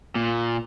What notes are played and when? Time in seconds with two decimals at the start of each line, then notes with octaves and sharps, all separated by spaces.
0.15 A#2